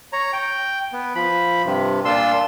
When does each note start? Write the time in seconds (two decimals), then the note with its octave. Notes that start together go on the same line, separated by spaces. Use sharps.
0.13 C#5 A#5
0.33 G5
0.93 B3
1.15 F3 B5
1.66 G2 C3
2.05 A#2 D4 F4 C6 E6